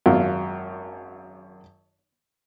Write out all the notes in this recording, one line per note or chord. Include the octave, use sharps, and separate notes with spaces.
G#1 F#2 F4